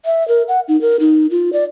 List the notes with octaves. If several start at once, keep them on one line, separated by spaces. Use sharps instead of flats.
E5
A#4
F#5
D#4
A#4
D#4
F4
D5